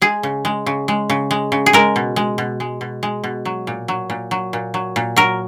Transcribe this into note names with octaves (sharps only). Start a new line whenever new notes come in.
G#3 G#4
C#3
G#3
C#3
G#3
C#3
G#3
C#3
G#4
G#3 A#4
B2
G#3
B2
G#3
B2
G#3
B2
F#3
A#2
F#3
A#2
F#3
A#2
F#3
A#2
F#3 A#4